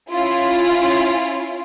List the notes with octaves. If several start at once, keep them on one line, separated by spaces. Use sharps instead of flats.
C#4 E4 F4